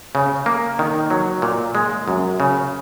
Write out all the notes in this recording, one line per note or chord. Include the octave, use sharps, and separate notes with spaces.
C#3
A#3
D#3
F#3
A#2
G#3
F#2
C#3